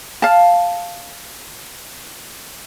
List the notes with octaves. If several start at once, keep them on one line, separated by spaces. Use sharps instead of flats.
F5 A5